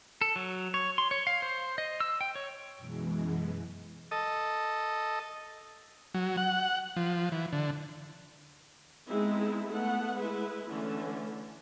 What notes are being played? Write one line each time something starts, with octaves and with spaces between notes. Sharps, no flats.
A4
F#3
C#5
C6
C#5
F5
C5
D#5
E6
G5
C#5
F#2 B2 E3 G#3
A4 D#5
F#3
F#5
F3
E3
D3
G#3 B3 C4 D#4 E4
A3 B3 F#5
G#3 E4 B4
D3 E3 A3 C#4